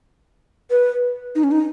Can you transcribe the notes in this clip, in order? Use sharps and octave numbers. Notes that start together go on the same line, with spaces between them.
B4
D#4
C#4
D#4